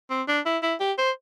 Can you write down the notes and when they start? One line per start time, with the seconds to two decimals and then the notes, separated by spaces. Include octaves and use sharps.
0.10 C4
0.28 D4
0.46 E4
0.63 E4
0.80 G4
0.98 C5